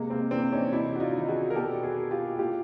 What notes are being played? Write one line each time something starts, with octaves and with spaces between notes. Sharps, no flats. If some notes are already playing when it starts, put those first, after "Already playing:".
Already playing: C3 G#3 A#3
A#3 C4
E3 C4 D4
C#4 D#4
C3 D4 E4
F#4
D#4 F4
D#3
F#4 G#4
A#4
B2 G4 A4
F#4 G#4
F4 G4
A2 F4 G4